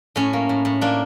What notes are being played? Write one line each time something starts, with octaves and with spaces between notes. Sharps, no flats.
A2 C#4
A#3
A2
A2
A#3 D4